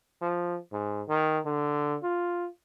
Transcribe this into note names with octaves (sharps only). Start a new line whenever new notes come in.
F3
G#2
D#3
D3
F4